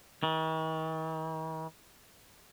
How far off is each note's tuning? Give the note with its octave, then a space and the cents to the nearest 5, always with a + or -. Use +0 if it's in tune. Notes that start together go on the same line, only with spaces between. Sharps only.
D#3 +45